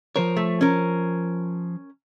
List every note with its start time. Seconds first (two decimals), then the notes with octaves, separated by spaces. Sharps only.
0.16 F3 A#4 C5 C#5
0.37 A3
0.61 C#4 A#4